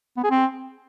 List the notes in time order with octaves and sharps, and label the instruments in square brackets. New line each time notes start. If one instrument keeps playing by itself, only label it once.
[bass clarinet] B3
G#4
C4